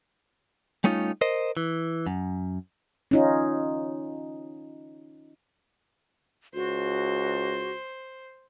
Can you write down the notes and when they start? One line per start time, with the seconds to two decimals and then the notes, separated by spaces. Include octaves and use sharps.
0.84 G3 A3 C#4 D#4 F4
1.21 A#4 C5 D#5
1.57 E3
2.07 F#2
3.11 C#4 D#4 F4
6.55 C#2 F#4 C5